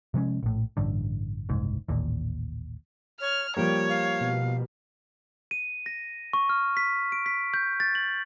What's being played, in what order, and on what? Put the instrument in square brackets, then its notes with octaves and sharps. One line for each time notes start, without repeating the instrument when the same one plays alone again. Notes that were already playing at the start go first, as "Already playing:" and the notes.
[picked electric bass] C3 F3 G#3 C#4
A#1 A2
A1 G2 D3
F#1 C2 G#2
A1 D#2 A#2
[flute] C#5 [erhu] F6
[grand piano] F3 G3 A#3 [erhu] C#5 [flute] G5
[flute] F5
[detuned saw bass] B2
[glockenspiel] D#7
A#6
C#6
F6
B6
D7
B6
G6
A6
F#7